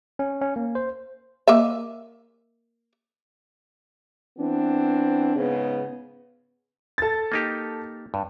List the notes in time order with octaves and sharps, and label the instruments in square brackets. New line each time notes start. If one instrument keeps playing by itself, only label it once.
[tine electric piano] C#4
C#4
A#3
C5
[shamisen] A#3 D#5 E5
[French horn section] E3 B3 C4 D4
G#2 C#3 B3
[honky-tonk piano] A4 A6
[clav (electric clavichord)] A#3 D#4 G4
G2